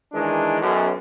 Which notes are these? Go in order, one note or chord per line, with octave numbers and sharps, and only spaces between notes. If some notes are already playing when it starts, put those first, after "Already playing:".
D#3 E3 G#3 D4
B1 F#2